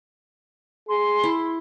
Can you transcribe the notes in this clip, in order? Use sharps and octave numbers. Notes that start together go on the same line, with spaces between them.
G#4 C6
E4